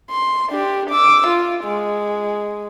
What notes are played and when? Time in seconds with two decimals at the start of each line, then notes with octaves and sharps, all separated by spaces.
0.11 C6
0.50 D4 G4
0.90 D6 E6
1.27 F4
1.64 G#3